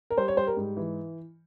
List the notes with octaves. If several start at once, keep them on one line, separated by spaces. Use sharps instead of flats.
A#4
G3 C5
C#5
G3 C5
A#4
G#2
E3